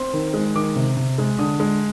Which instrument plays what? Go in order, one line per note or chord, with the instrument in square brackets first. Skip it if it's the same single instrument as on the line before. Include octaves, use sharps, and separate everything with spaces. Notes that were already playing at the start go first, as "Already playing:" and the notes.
Already playing: [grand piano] C4 C6
D#3
G#3
D#3 D6
C3
C3
G#3
D3 D#6
G#3